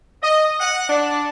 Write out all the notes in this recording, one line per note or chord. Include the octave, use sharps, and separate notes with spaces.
D#5
F#5
D4